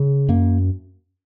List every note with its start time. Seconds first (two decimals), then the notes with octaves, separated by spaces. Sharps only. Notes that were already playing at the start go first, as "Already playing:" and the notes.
Already playing: C#3
0.29 F#2 A#3